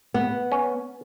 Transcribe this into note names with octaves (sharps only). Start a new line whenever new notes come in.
B3
C#4